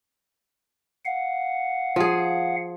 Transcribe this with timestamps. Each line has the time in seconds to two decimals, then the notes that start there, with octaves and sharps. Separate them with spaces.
1.05 F5 F#5
1.96 F3 G#4